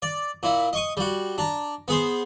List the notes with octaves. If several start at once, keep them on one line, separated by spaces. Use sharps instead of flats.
D5
A#2 E4
D#5 C#6 D#6
G3 F#4
D4 A#5
B3 G#4 C5